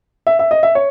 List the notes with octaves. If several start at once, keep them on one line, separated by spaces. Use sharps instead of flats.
E5
E5
D#5
E5
C#5